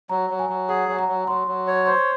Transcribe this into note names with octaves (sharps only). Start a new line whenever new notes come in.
F#3 A#5
F#3
G#5
F#3
G#4 F#5
F#3
A#5
F#3
F#3 C6
F#3
C#5
C5 C6